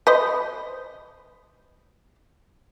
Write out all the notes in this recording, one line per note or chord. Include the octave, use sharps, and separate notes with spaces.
B4 C5 D#5